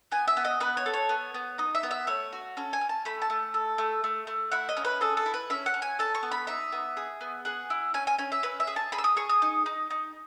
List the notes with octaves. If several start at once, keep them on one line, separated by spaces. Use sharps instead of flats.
B3 G#5
E5
B3
D#5
B3 B4
C#5
A4
C#5
B3
B3
D#4 D#5
E5
B3
E5
A3 C#5
F#4
C#4 A4
G#5
C#4
A5
A3 B5
A5
A3
A4
A3
A3
A3
E4 F#5
D#5
C#4
B4
G#4 A4
A4
E4
B4
C#4 E5
F#5
C#4
G#5
A4 A5
C#6
B3
B5
D#4 E5
B3
G#4
B3
G#4 F#5
E4
C#4 G#5
G#5
C#4 G#5
E5
C#4 B4
E5
G#4
A5
G#4 B5
E6
D#6
G#4 C#6
D#6
D#4
D#4
D#4